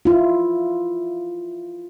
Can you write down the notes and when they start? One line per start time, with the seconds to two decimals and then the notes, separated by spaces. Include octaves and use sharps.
0.05 E4 F4